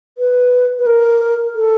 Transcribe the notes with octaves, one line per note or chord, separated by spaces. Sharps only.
B4
B4
A#4
A4